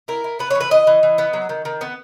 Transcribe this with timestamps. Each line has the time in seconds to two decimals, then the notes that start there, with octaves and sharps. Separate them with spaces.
0.08 E4 A#4
0.24 E4
0.39 B3 B4
0.50 C#5
0.55 E3
0.60 B4
0.71 E3 D#5
0.87 E3
1.03 E3
1.18 B3
1.33 F#3
1.49 D#3
1.65 D#3
1.81 B3